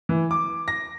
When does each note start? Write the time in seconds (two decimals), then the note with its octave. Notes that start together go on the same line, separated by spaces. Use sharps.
0.09 E3
0.31 D6
0.68 A#6